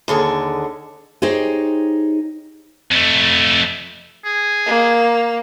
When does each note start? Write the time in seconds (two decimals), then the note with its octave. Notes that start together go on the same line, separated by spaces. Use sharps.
0.08 D#2 D3 G#4 F#5
1.22 D#4 G4 G#4 C5 C#5 D#5
2.91 F2 A3
4.25 G#4
4.67 A#3